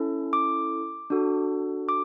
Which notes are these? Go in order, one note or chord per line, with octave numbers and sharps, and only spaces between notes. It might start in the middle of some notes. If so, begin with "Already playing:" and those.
Already playing: C#4 E4 A4
D6
D4 F#4 A4
D6